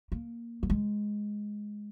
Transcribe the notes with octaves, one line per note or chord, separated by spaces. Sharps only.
A#3
F#3
G#3